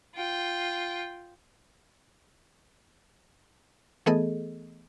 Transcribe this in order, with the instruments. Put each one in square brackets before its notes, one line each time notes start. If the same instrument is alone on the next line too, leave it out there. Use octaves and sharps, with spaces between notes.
[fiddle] F4 G5
[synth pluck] E3 A3 B3 G#4 A4 D#5